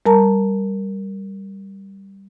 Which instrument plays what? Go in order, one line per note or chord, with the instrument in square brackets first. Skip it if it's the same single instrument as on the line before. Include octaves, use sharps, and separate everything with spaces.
[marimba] G3 A#4 A5 A#5